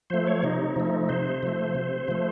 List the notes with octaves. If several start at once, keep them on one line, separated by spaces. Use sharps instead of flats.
F3 A3 C5
C#5
C3 D#4
F3 A3
C3 C5
F3 A3
C3
F3 A3